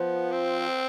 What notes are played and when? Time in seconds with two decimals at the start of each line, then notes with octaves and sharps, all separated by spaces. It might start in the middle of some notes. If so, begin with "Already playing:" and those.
Already playing: F3 B3
0.32 C4